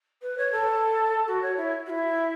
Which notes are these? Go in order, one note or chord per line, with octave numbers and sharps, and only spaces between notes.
B4
C#5
A4
F#4
C#5
E4
F#4
E4